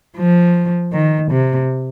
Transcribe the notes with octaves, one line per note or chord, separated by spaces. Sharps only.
F3
D#3
C3